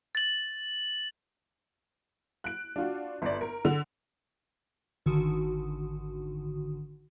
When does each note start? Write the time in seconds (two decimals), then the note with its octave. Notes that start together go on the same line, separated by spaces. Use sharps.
0.15 A6 F#7
2.44 F#6 D7
2.76 D4 F4 F#4
3.22 G1 D5
3.41 A#4
3.65 D3
5.06 G#1 D3 D#3 F#4 D#6